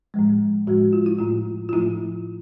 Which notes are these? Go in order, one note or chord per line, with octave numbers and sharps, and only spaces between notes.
A2 F3 G#3
A2 F3 G#3 F#4
F4
E4
A2 F3 A3 F4
F4
A2 F3 A3 E4